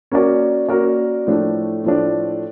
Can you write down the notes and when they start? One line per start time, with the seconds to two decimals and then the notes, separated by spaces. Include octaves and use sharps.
0.12 A#3 C#4 F#4 A#4 D5
0.69 A#3 C#4 F#4 A#4 D5
1.27 A2 F3 A3 D4
1.84 A2 F3 A3 D4